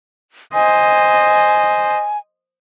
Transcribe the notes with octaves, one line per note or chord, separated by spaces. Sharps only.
C5 D#5 G#5